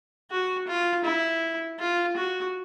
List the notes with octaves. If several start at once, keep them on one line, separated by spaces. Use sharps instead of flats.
F#4
F4
E4
F4
F#4